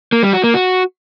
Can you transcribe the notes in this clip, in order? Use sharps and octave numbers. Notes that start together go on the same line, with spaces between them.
A#3
G3
F#4
A#3
F#4